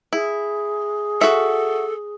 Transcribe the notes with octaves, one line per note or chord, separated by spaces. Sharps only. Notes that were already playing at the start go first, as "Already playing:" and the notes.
E4 G#4
F#4 A4 E5